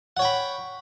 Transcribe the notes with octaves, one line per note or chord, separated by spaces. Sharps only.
C#5 F#5 G5 B5